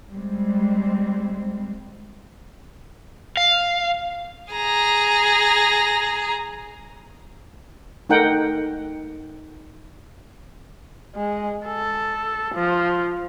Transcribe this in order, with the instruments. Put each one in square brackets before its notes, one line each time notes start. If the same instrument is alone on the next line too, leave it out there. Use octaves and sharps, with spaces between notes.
[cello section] G3 G#3 C4
[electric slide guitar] F5
[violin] G#4 A#5
[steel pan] A3 D#4 A#4 F#5 G5
[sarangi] G#3
A4
F3